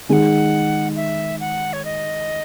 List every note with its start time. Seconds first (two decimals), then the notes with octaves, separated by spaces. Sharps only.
0.09 D#3 G#3 D#4 G#4 F#5 G#5
0.96 E5
1.40 F#5
1.73 C#5
1.85 D#5